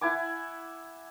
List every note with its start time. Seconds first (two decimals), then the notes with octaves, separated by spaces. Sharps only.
0.01 E4 F#5 G#5 D6